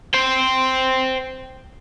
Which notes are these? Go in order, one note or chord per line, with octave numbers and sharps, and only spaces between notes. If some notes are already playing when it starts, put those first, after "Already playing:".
C5 G5